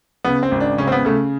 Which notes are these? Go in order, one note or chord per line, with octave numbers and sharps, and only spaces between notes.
C#3 B3
C4
G#1
D4
C#3 C#4
C4
B3
C#3 A3